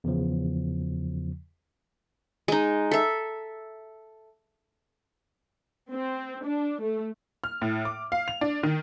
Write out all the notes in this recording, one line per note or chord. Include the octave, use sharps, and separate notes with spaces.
E2 C#3 F3
G#3 D#4
A4 E5
C4
D4
A3
F6
A2
D6
F5
F7
D4
D#3